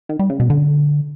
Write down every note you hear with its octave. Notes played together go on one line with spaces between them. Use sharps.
D#3
G3
C#3
B2
D3